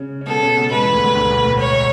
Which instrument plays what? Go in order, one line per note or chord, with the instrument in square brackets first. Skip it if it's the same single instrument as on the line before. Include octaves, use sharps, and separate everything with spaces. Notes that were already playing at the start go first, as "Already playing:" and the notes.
Already playing: [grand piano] C#3 C#4
C#4
[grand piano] B2 B3 [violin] A4
[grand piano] C#3 C#4
B2 B3
[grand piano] G#2 G#3 [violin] B4
[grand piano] E2 E3
D2 D3
D2 D3
D2 D3
B1 B2
A2
[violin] C#5